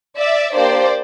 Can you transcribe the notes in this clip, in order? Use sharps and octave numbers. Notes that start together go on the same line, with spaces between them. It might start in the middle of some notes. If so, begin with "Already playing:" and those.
D5 E5
A#3 D4 G4 C5 D5